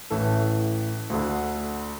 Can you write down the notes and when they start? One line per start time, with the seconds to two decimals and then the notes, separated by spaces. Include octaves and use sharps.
0.10 A1 A2 E3 A4
1.10 D2 D3